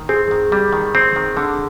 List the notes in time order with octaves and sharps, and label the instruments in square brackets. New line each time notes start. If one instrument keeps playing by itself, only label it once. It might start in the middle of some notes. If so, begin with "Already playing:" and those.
Already playing: [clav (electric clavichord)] D#3
[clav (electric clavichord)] C4 [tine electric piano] G#4
[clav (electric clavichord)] D#3
G3
D#3
C4
D#3
D3